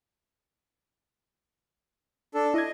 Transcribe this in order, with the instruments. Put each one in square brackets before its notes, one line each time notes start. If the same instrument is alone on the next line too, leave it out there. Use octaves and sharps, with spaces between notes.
[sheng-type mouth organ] D4 A4
[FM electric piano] E4 D6 G#6 [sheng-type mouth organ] D#5